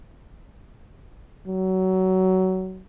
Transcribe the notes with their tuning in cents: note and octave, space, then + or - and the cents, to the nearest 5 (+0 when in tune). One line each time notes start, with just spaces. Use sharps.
F#3 +20